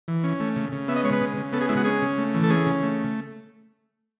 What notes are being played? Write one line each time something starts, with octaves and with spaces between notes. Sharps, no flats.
E3
C#4
A3
C#3
C#3
B3 E5
D#5
G#3 C#5
B4
C#3
C#3
B3 A4
G#4
G#3 E4
F#4
C#4 G#4
C#3
A3
E3
A4
C#4 G#4
C#3
A3